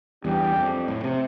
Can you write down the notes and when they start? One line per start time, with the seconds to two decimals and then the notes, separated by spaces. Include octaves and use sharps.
0.24 E2 G3 D4 G4
0.56 F2
0.88 A2
1.04 C3